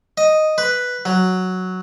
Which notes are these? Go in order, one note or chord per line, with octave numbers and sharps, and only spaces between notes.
D#5
B4
F#3